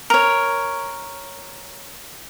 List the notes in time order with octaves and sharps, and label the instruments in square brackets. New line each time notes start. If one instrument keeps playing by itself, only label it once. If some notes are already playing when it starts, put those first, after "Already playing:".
[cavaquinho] A#4 C#5